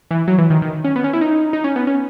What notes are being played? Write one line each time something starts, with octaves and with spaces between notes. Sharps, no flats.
E3
F#3
E3
D#3
D#3
C#4
B3
C#4
E4
D#4
D#4
C#4
B3
C#4